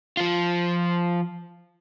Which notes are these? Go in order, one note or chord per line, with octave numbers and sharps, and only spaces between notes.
F3 F4